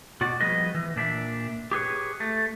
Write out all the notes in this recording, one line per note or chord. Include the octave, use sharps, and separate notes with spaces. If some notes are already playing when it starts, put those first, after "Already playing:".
B2 F#4 D5
F3 G3 B3 G#4 B4 D#5
E3
A#2 D4 E5
G4 G#4 B4 C#5
A3